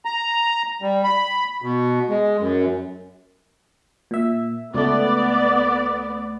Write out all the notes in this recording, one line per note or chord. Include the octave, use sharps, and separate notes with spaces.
A#5
G3
B5
B2
G#3
F#2
A#2 E5
C#2 A3 B3 D5